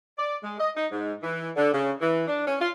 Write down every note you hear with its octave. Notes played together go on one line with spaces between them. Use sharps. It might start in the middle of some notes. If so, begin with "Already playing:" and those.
D5
G#3
D#5
D#4
G#2
E3
D3
C#3
E3
D4
C#4
F4